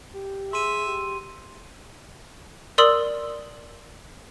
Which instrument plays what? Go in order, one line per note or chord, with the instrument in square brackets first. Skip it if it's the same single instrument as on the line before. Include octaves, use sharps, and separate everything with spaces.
[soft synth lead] G4
[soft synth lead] G#4 [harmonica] E5 [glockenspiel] C6 D#7
[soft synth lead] G4
[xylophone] A#4 D5 C6 D#6 E6 F#7